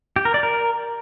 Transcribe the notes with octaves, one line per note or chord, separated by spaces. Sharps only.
G4
A#4
D5
A#4